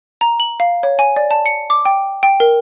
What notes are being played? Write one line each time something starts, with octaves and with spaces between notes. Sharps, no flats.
A#5
F#7
F5
C#5
G#5
D5
A5
C#7
D6
G5
G5
A#4